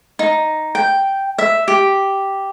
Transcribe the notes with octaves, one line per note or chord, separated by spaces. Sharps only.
D#4
G5
E5
G4